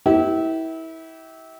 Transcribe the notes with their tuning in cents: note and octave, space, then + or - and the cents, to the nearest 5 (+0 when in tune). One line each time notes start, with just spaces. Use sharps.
E4 -25 G4 -30 A#4 +30